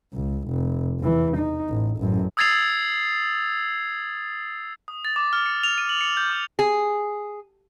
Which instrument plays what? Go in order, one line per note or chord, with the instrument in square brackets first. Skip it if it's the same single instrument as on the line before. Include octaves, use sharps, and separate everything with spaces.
[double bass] C#2
F1
E2 E3
D#4
A1
A1 F#2
[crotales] D#6 E6 G#6 A6 C7 F7
D#6
A6
D6
F6
C#7
F7
D#7
F#7
C#7
G6
D6
[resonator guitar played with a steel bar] G#4